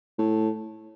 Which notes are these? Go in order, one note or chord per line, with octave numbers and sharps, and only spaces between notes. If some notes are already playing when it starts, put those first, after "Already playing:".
A2